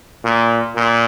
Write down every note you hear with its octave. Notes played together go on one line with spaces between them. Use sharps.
A#2
A#2